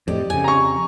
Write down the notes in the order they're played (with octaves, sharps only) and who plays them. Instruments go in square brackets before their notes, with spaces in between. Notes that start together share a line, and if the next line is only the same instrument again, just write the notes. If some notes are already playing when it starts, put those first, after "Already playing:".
[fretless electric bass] F2 A2 [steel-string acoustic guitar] G4 D5 D#5
[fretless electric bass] F2 C#3 [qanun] G#5
[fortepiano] A#5 C#6